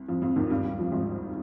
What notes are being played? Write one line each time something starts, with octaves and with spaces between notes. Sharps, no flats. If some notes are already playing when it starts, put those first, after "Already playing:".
Already playing: C2
F2 F3
F2 F3
D#2 D#3
G2 G3
G2 G3
F2 F3
G#1 G#2